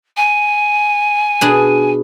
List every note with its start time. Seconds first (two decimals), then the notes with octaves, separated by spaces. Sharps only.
0.16 G#5
1.41 B2 D4 G#4